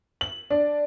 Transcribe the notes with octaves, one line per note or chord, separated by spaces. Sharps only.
F#7
D4